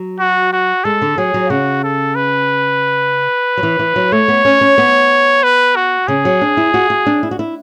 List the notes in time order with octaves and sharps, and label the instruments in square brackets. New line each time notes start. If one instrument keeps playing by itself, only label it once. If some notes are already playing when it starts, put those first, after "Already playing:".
Already playing: [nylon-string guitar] F#3
[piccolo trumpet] F#4
F#4
[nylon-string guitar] G#3 [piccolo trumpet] A4
[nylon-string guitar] D3
[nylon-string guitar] F#3 [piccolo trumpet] G#4
[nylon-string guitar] F#3
[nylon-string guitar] C#3 [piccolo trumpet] F#4
[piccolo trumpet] A4
B4
[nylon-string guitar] F#3
E3
E3
F#3
[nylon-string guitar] A3 [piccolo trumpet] C#5
[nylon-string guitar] B3
C#4
C#4
B3
[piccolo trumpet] B4
F#4
[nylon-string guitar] C#3 [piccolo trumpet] G#4
[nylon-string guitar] F#3
D4
E4
F#4
F#4
D4
E4
F#4
E4